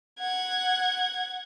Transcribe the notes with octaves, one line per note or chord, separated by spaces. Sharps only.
F#5 G#6